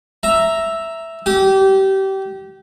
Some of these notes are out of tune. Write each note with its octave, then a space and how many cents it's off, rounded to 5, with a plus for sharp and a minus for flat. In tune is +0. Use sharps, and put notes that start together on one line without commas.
E5 +0 A#5 +0
G4 -25 D#6 +0